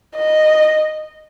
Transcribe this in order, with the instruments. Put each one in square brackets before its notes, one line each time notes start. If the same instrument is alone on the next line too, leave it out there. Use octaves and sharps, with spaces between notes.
[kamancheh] D#5